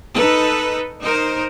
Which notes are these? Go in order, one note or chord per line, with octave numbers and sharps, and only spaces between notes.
D#4 A4 B4
D#4 A#4 C5